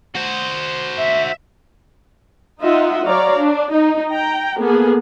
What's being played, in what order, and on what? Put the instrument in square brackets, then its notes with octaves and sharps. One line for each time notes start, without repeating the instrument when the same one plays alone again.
[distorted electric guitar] F#4 C5
[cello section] E5
[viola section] D#4 F4 D#5 E5 F#5
F#3 C#5 D5 F5 A#5
D4
D#4
G5 A#5
A#3 B3 G#4 A4